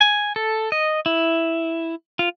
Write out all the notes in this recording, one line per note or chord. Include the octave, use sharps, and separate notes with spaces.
G#5
A4
D#5
E4
F4